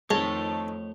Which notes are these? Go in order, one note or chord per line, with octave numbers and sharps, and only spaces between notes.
F2 D#3 G#3 A3 C#5 A5